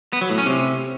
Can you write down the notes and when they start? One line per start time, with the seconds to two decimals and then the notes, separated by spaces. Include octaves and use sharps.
0.13 B3
0.21 F#3
0.30 A2
0.38 C#4
0.46 C3